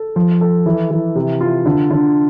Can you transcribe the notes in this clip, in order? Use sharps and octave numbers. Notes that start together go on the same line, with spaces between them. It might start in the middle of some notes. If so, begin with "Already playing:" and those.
Already playing: A4
F3
A4
E3
E3
C3
F4
D3
D3